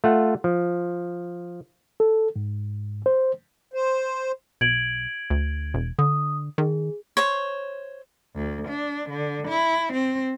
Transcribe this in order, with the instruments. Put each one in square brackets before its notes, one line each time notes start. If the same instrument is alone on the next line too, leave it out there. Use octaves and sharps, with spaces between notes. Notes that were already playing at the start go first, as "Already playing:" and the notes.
[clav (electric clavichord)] A3 F4 F#5
F3
[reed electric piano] A4
G#2
C5
[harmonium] C5
[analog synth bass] B1 [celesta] G#6 D7 F#7
[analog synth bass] D2
E1
[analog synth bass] D3 [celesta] D#6
[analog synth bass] D#3 [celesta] G#4
[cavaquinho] C5 C#5
[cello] D2
D4
D3
E4
C4